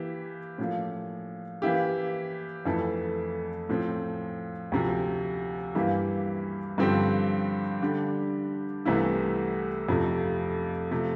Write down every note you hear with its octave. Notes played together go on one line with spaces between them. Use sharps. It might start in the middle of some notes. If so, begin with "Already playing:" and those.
Already playing: E3 A#3 E4 G4
A2 F3 A#3
E3 A#3 E4 G4
F2 E3 A3 E4 A4
A2 F3 C4
D2 C3 F3
G2 E3 A#3 E4 G4
G2 D3 F3 C4 G4
D3 G3 D4 G4
C2 C3 E3 A3 E4
F2 C3 F3 A3
C3 F3 A3